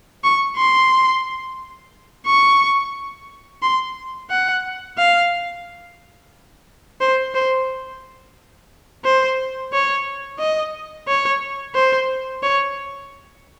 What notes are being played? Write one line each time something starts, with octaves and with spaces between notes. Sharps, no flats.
C#6
C6
C#6
C6
F#5
F5
C5
C5
C5
C#5
D#5
C#5
C5
C#5